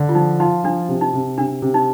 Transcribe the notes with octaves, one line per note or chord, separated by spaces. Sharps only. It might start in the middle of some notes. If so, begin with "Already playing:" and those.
Already playing: D3
F4
F3 D#4
D#4 F4
F3 D4
C3
D#4
C3
C3 D4
C3
D#4